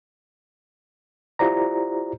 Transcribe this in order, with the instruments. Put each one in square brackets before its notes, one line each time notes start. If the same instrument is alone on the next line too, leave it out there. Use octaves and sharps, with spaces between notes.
[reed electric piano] E4 F4 G4 C5 D5 A#5